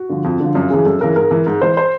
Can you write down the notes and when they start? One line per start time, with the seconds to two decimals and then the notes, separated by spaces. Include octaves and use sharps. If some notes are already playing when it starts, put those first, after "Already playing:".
Already playing: F#4
0.09 D3 F3
0.25 F2
0.40 D3 F3
0.55 F#2 F4
0.70 C#3 E3 G#4
0.85 F#2 A4
1.00 C#3 E3 A#4
1.16 G#2 A#4
1.31 E3
1.46 G#2
1.62 E3 C5
1.77 C5